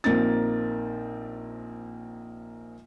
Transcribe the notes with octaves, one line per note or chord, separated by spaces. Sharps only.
A#1 A#3 C4 D#4 A6